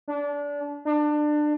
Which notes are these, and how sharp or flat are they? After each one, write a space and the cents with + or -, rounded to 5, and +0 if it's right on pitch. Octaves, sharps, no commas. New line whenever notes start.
D4 -25
D4 +25